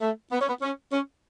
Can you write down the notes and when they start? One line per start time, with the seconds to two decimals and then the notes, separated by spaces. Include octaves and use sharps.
0.01 A3
0.32 B3
0.41 C#4
0.49 B3
0.62 C#4
0.92 C#4